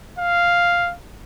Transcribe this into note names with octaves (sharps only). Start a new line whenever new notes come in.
F5